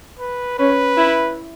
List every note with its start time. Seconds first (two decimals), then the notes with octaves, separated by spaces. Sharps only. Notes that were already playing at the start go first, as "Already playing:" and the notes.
0.19 B4
0.58 C#4 B4
0.98 E4